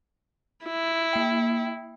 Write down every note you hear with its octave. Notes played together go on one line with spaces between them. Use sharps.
E4
A#3 G5